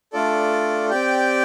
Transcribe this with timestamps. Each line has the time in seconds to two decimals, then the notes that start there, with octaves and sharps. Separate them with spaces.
0.13 A3 D4 F4 A4 D5
0.90 C4 G4 D5 G5